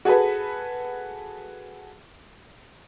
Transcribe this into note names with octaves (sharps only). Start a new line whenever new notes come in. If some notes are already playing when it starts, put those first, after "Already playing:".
F#4 G#4 A4 B4